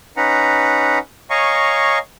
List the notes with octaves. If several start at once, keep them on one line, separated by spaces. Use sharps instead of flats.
C#4 D#4 B4 F#5 A#5
C#5 D#5 F5 G#5 A#5 C#6